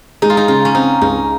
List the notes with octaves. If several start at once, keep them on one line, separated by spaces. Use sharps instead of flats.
G#3 D#4
F4
D#4
C#3 F4
C#4
C4 D#4
C#2 D#4